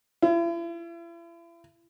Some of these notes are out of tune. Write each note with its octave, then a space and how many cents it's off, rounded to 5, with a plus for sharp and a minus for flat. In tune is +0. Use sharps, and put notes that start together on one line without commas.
E4 +40